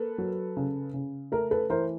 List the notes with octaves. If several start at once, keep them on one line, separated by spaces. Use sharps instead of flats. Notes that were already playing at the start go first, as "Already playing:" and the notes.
Already playing: A#3 A4 B4
F#3
C#3
C#3
A3 A#4
A4 B4
E3 A#4 C5